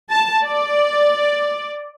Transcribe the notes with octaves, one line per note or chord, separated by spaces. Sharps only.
A5
D5